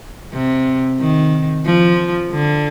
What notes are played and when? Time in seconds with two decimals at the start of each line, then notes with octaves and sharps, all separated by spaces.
0.33 C3
1.00 D#3
1.66 F3
2.32 D3